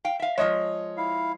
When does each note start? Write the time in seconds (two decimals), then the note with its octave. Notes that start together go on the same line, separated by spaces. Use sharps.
0.05 F5 G5
0.20 E5 F5
0.38 F3 G#3 C#5 D#5
0.97 E4 F5